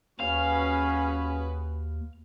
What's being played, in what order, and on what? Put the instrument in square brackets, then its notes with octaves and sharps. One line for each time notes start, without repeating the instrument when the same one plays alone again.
[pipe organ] D#2 [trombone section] C#4 [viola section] F#4 G#4 B4 [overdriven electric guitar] F5